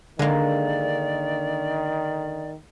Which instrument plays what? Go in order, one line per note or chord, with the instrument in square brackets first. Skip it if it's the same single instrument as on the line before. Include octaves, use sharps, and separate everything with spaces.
[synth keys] D3 [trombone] D#3 [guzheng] G#3 A#3 [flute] D5